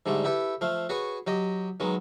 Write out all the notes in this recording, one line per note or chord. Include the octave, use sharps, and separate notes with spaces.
G#2 D3 G3 A3
E4 G4 A4 B4
F3 A3 F5
F#4 G#4 B4 C#5
F#3 G4 D#5
D#3 F#3 G#3 B3